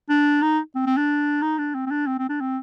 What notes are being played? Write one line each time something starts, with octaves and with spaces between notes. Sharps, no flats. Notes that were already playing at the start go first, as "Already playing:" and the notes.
D4
D#4
C4
C4
D4
D#4
D4
C4
C4
D4
C4
C4
D4
C4